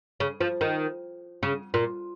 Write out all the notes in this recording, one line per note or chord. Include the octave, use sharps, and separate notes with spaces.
C#3
F3
D#3
C#3
A#2